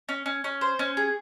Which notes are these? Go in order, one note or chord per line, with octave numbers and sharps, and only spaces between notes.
C#4
C#4
C#4
C5
C#4
G#4